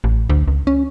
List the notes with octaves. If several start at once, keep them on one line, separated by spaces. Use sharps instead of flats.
A1
D2
C#2
C#4